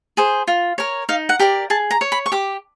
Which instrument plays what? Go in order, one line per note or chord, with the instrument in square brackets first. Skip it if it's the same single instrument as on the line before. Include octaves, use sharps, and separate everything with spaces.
[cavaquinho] G#4 C5
F4
A#4 C#5
D#4 F5
F#5
G4 A#4 D5
G#4 A5
A#5
C#5
B5
C#6
G4 D6